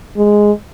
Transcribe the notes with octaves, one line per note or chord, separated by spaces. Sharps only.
G#3